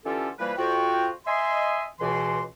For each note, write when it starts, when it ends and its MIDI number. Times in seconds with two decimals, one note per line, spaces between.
0.05 0.29 50
0.05 0.29 52
0.05 0.29 61
0.05 0.29 65
0.05 0.29 67
0.05 0.29 69
0.39 0.52 52
0.39 0.52 53
0.39 0.52 55
0.39 0.52 58
0.39 0.52 71
0.58 1.10 41
0.58 1.10 65
0.58 1.10 66
0.58 1.10 79
1.26 1.84 75
1.26 1.84 76
1.26 1.84 80
1.26 1.84 84
2.00 2.44 37
2.00 2.44 47
2.00 2.44 52
2.00 2.44 84